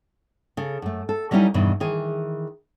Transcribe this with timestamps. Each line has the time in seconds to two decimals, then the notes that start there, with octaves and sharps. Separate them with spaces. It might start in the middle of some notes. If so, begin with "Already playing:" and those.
0.57 C#3 A4
0.82 F#2 A3
1.09 A4
1.31 F#3 G3 C#4 D#4 E4 G4
1.54 E2 G2 B2 D#3 E3
1.80 D#3 E3 G#4